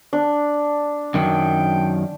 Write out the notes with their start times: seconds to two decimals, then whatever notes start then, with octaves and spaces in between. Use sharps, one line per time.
0.13 D4
1.14 F#2 D#3 F#3 G5